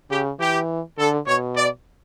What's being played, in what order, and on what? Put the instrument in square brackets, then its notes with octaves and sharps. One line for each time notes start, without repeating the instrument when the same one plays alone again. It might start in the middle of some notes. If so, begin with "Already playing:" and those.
[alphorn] C#3 [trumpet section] G4
[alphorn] E3 [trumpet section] G4
[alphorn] D3 [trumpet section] A4
[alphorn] B2 [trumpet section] C#5
[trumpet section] D5